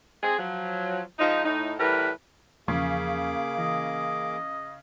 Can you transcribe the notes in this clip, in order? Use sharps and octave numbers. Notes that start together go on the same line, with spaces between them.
C4 G#4
F3 F#3
F3 G#3 D#4
A2 D#4
A2 E3 G3 A#4 B4
E2 C#3 F3 A#3 G#4 D6
E3 D#5